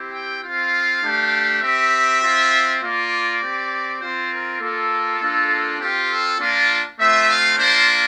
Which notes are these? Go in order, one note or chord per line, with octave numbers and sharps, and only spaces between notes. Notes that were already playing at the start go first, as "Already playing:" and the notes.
Already playing: C4 E4 G4
G5
C4 F4 F5
A3 D4 G4
C4 G4 E5
C4 F4
A#3 F4 D5
C4 G4
C4 F4 C5
A#4
A#3 F4 A4
A#3 D4 F4
C4 F4 G4
A4
A#3 D4 F4
A3 C4 F4 E5
F5
A#3 D4 F4 C5